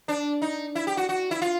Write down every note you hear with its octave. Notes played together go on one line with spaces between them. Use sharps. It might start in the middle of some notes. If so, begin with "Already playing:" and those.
D4
D#4
E4
G4
F#4
F#4
E4
F4